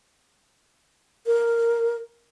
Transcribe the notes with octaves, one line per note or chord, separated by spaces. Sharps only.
A#4